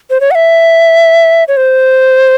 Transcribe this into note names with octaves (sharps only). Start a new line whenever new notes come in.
C5
C#5
F#5
E5
C#5
C5